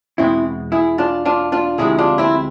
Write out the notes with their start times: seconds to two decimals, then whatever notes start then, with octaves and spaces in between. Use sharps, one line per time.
0.18 E2 B2 G#3 C4 E4
0.72 E4 G#4
0.98 D4 F4
1.25 D4 F4
1.52 D4 F4
1.78 D2 C3 F3 G#3 E4 G#4
1.98 D4 F4
2.18 C4 E4